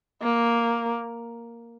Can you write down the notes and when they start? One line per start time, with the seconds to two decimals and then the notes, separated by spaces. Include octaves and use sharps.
0.22 A#3